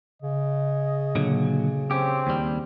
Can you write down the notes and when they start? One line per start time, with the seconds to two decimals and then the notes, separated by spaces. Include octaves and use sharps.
0.22 C#3 D#5
1.16 A#2 D3 F#3
1.91 C4 C#4 G4
2.27 D#2 G3